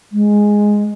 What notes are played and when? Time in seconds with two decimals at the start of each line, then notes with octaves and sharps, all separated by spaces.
0.12 G#3